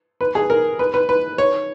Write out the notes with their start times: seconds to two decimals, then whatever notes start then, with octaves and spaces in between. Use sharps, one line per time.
0.21 B4
0.35 G#4
0.50 A#4
0.79 B4
0.94 B4
1.09 B4
1.38 C#5